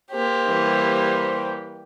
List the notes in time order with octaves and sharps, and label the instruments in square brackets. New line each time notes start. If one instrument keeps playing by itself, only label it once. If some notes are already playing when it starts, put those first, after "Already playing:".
[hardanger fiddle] A#3 G4 [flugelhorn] C5
[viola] E3 G3